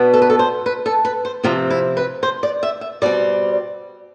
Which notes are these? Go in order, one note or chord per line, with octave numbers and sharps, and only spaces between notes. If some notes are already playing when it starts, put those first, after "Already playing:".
Already playing: B2 B3 D4
A4
B4
A4
C5
B4
A4
B4
C5
C3 F3 C4 F4
E4
B4
C5
D5
E5
E5
B2 G3 C4 D5